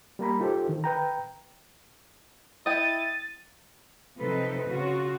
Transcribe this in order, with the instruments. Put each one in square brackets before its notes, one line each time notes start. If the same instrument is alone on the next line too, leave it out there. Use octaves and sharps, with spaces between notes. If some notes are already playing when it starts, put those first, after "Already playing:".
[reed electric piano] G3 A#3 A#5 B5
D#4 F4 G4 A4 C5
D#3
B4 G5 A#5
[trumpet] E4 [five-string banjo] D#5 G5 [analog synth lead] A6 [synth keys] D#7
[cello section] C3 F3 C4 D#4 A4 B4
C#3 F4 F#4